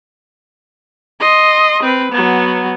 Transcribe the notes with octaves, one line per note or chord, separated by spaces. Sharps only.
D#5 C6
C4 B4
F#3 B3